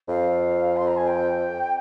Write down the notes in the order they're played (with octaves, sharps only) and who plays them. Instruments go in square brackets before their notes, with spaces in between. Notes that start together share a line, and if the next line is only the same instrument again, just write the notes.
[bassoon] F2 [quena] F5
[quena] C6
A#5
G#5
G5